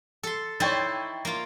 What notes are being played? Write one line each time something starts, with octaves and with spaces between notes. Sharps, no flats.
A4 C6
D#4 E4 C5 C#5 G5 A6
A#3 F4